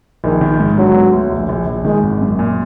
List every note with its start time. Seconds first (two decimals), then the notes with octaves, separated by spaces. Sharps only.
0.24 A#1 D#3
0.41 D#3
0.60 G#2
0.78 D3 F#3
0.95 B3
1.13 D2
1.31 A#1
1.49 A#1
1.67 A#1
1.85 D#3 G#3
2.03 G#1
2.21 F#2
2.39 A#2